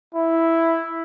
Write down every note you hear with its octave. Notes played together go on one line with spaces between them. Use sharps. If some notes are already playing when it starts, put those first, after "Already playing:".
E4